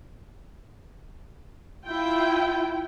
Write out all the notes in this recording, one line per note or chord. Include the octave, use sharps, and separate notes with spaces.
E4 F4 G5